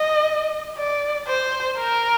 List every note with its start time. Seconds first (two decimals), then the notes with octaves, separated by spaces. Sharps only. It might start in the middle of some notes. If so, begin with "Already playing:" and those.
Already playing: D#5
0.77 D5
1.28 C5
1.79 A#4